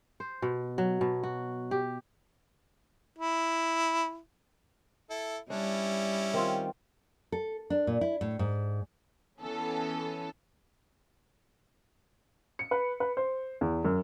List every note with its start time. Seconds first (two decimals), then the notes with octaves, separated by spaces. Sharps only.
0.20 C5
0.42 B2
0.78 F#3
1.01 B2
1.23 F#4
1.71 G4
3.19 E4
5.10 E4 A4
5.50 G3 C#4 D4 E4
6.34 D#3 C4 F4
7.32 A4
7.70 D4
7.87 A#2
8.01 E4
8.21 A2
8.39 G#2
9.40 E3 B3 C#4 A4
12.59 C#7
12.71 B4
13.00 B4
13.17 C5
13.61 E2
13.85 F#2